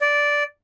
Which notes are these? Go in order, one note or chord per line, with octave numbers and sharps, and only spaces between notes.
D5